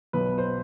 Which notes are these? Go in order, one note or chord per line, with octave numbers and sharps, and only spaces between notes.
B1 B2 F#3 B3 B4
C5